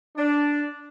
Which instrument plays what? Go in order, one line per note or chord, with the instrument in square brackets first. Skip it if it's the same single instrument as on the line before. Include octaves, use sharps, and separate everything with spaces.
[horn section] D4